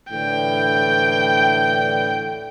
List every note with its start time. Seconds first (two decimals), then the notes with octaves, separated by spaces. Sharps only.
0.11 A2 D3 E3 G5